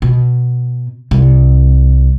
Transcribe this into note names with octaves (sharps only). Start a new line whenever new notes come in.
B2
C2